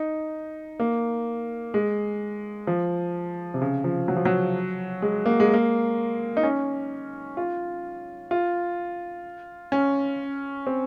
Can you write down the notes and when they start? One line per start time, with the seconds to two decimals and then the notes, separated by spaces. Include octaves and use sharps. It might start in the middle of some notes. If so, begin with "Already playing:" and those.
Already playing: D#4
0.80 A#3
1.74 G#3
2.67 F3
3.54 C3
3.62 C#3
3.84 F3
4.08 F#3
4.17 F3
4.25 F#3
5.02 G#3
5.26 A#3
5.40 G#3
5.54 A#3
6.37 D#4
6.43 C#4
7.37 F4
8.31 F4
9.72 C#4
10.67 C4